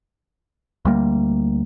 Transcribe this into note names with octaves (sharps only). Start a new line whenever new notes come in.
D2 G3 A#3